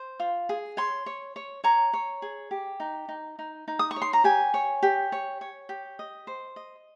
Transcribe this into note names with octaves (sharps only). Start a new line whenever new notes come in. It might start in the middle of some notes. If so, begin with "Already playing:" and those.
Already playing: C5
F4
G#4
C#5 C6
C#5
C#5
C#5 A#5
C#5
G#4
G4
D#4
D#4
D#4
D#4
D#6
C#6
C#5
C6
A#5
G4 G#5
C#5
G4
C#5
C#5
G4
D#5
C5
D#5